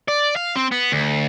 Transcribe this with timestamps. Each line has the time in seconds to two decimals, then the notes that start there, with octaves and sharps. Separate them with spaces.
0.08 D5
0.36 F5
0.56 C4
0.71 B3
0.92 D2